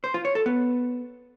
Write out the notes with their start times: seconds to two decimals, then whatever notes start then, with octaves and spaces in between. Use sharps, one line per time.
0.04 C5
0.14 F4
0.25 C#5
0.35 A4
0.46 B3